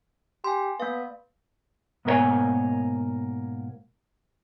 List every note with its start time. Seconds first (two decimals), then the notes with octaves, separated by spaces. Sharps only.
0.44 G4 G#5 C6
0.80 A#3 B3 F5
2.05 G#2 B2 A#3 A#4 C#5 G#5